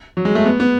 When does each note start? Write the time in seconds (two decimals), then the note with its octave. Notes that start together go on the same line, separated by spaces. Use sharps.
0.17 F#3
0.25 G#3
0.35 A3
0.45 B3
0.60 B3